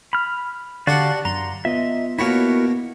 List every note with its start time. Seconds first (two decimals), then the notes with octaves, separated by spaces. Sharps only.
0.13 B5 F6
0.87 D3 D4 F#4 G4 D5 F5 F#5
1.25 F#2 A#5 C6
1.65 B3 F4 D#5 E5
2.19 B2 A#3 E4 F#4 A#4 C#5